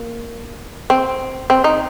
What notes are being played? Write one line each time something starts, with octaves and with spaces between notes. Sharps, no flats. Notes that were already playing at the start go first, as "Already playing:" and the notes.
Already playing: A#3
C4
C4
D#4